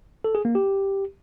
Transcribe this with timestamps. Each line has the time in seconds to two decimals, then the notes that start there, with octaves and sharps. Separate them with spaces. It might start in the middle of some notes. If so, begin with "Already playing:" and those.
0.24 A4
0.35 G#4
0.45 A#3
0.55 G4